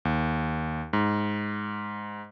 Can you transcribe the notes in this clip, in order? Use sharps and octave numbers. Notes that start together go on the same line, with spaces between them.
D#2
G#2